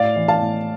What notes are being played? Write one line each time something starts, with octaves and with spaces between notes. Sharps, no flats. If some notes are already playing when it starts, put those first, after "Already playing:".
Already playing: A2 D5 F5
E3
F5 A5
A2